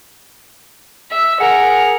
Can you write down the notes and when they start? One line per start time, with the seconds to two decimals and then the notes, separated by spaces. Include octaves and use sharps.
1.11 E5
1.40 G#4 A#4 F#5